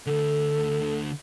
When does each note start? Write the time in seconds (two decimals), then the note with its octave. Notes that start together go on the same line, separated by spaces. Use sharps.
0.07 D2 D3 A4